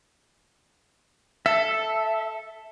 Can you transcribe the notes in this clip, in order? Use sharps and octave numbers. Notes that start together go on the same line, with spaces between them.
A4 E5